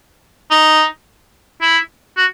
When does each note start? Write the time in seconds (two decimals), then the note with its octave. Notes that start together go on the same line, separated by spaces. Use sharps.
0.51 D#4
1.61 E4
2.17 F#4